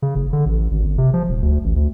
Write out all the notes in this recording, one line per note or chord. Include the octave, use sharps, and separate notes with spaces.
C#3
F#1
D3
A1
G#1
G1
C3
F3
D#1
D2
A1
D2